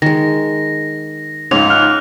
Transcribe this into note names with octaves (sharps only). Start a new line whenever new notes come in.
D#3 G#3 A#6
C#2 G#2 C#4 F7
F6 F#6 F7